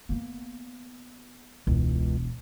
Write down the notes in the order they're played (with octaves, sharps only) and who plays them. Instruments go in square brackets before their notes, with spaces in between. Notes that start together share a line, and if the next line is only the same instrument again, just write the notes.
[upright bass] A#3 B3
[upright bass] E1 [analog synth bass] C#2